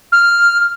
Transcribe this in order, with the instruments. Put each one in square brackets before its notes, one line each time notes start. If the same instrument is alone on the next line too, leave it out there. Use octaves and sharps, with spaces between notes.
[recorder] F6